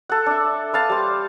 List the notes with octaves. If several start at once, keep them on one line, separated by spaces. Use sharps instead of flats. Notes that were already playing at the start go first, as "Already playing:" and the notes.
A4 F#5
D4 E5
B4 F5 A5
G3 C5